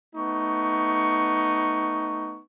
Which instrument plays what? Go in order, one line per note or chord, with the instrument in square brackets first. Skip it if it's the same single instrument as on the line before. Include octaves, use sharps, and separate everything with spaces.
[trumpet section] A3 B3 D#4 C#6